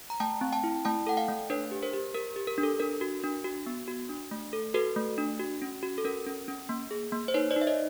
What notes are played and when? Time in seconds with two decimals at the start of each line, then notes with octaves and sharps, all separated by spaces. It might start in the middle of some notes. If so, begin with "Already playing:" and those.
0.10 A#5
0.20 A3 G5 A5
0.41 C4
0.52 G5 A5
0.64 E4
0.85 A3 G5 A5
1.07 A4 F#5
1.17 F5 G5
1.28 A3
1.50 D4 B4 C#5
1.71 G4
1.82 A#4 C5
1.93 G4
2.14 G4 A#4
2.36 G4
2.47 A#4
2.58 D4
2.63 A4
2.80 D4 A#4
3.01 F#4
3.24 D4
3.44 F#4
3.66 B3
3.87 F#4
4.09 D4
4.31 A3
4.53 A4
4.74 F#4 A4 B4
4.96 A3
5.18 D4
5.40 F#4
5.62 C#4
5.83 F#4
5.98 A4
6.05 C#4 A#4
6.26 C#4
6.48 C#4
6.69 A#3
6.91 G#4
7.12 A#3
7.28 C5
7.34 D#4 B4 C#5
7.51 C5 D5
7.56 D#4
7.62 E5
7.67 C#5 D#5